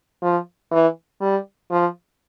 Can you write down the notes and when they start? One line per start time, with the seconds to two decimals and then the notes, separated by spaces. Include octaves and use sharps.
0.22 F3
0.72 E3
1.21 G3
1.71 F3